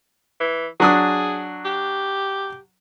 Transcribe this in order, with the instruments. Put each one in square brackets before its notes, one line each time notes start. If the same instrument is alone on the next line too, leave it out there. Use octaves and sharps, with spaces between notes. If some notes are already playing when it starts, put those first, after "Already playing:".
[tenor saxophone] E3
[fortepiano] F#3 D4 D#6 [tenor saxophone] G#4
[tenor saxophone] G4